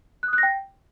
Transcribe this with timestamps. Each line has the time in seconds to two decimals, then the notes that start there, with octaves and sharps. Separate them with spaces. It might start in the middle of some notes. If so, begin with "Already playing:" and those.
0.23 F#6
0.28 D#6
0.33 F#6
0.38 A#6
0.43 G5